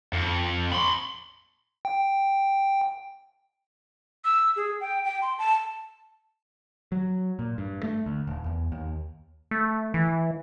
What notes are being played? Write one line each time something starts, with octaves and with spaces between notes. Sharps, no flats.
F2
B5 C6
G5
E6
G#4
G5
G5
C6
A5
F#3
A#2
G2
A3
D2
D#1
E2
D#2
A3
E3